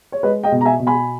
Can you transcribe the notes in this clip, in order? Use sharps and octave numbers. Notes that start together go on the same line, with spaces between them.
C#5
G#3 B4 D#5
D#5 G5
B2
A#5
E5 G#5
B2
G#5 B5